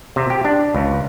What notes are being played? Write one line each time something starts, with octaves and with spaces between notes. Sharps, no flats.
C3
G4
D4
C#2